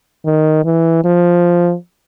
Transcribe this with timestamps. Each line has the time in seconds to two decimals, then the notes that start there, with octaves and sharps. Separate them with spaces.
0.25 D#3
0.65 E3
1.05 F3